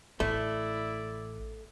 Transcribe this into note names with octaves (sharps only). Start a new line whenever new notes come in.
A1 A3 E4 D5